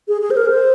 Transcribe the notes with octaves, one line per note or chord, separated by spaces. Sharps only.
G#4
G#4
C5
A#4
C5